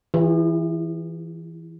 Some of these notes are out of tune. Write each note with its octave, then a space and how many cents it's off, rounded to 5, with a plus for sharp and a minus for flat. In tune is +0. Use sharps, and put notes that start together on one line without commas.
E3 +0 F4 -40 G#4 -45